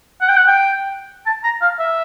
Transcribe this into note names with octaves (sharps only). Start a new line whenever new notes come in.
F#5
G5
F#5
G5
A5
A#5
F5
E5